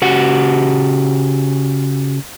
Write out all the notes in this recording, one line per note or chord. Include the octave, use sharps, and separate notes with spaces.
C#3 F#4 G4 F#5